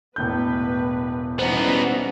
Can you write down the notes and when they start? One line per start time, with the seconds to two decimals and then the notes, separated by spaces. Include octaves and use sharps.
0.16 E1 A2 B4 G6
1.39 E3 G3 B3 C#4 D#4 C5